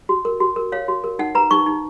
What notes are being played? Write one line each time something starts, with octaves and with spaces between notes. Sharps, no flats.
F#4
A#4
F#4
A#4
C#5 F5
F#4
A#4
D#4 F#5
B4 A#5
D#4 C#6
D#4